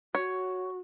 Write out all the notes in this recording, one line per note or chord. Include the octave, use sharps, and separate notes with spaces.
F#4 C#5